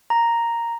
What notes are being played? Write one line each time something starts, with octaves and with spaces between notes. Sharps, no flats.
A#5